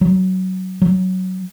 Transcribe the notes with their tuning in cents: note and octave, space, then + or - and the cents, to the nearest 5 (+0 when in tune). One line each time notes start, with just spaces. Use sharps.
F#3 +15
F#3 +10